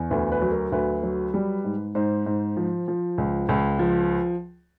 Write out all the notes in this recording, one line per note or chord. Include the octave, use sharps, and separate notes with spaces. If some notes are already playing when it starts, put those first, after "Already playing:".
Already playing: E2
D2 B4
B4
F#3
A#4
D2 B4
F#3
G3
G#2
G#2 C5
G#2
F3
F3
C#2
C#2
F3